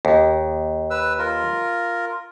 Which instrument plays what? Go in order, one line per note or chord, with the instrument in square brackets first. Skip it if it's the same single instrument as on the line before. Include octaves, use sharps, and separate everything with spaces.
[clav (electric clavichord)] D#2
[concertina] B4 E6
F4 A#4